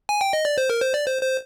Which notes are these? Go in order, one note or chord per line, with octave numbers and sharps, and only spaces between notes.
G#5
G5
D#5
D5
C5
A#4
C5
D5
C5
C5